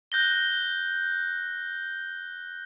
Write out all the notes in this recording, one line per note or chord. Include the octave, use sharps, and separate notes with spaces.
F#6 G6 A#6 G7